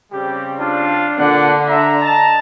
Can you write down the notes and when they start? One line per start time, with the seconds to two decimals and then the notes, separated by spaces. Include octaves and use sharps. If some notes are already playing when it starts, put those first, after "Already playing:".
0.13 C#3 G3 C4 G4
0.60 D4 F4
1.19 A#2 D3 D5 F#5
1.68 E5 A#5
2.01 D#5 A5